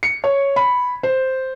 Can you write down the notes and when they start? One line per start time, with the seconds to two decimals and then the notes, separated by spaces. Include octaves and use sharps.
0.03 C#7
0.24 C#5
0.56 B5
1.03 C5